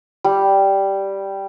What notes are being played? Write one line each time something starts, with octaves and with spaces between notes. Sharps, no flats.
G3